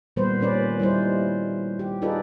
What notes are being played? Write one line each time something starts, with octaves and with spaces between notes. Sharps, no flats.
A#2 D#3 G3 B3 B4 C5
A#2 D#3 C#4 B4 D5
G3 D#4 E4 C5
G4
D#4 F4 G#4 A4 B4 D5